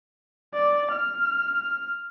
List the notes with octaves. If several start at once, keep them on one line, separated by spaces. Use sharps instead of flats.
D5
F6